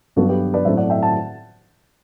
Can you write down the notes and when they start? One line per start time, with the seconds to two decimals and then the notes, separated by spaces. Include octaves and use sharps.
0.16 G2 F#3 B3 F#4 A4
0.29 G4 B4
0.54 B4 D5
0.65 A2 F#3 A3 C4 C5 E5
0.77 D5 F#5
0.90 E5 G5
1.02 F#5 A5